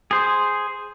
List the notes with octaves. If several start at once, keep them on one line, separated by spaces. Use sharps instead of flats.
G#4 C5